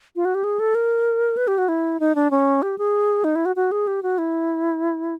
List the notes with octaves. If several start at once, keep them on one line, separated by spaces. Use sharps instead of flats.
F4
F#4
G4
G#4
A4
A#4
B4
G4
F#4
E4
D#4
D4
C#4
G4
G#4
D#4
E4
F#4
F#4
G#4
G4
F#4
E4